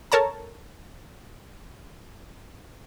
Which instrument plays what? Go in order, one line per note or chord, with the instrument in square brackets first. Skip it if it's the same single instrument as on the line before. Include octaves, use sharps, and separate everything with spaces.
[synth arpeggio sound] A4 A#4 C#5 A5 A#5